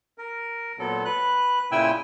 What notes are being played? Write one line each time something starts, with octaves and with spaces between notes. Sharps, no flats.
A#4
A#2 F#3 B3 A4
B4 F#6
A#2 C#3 E4 G5 G#5 E6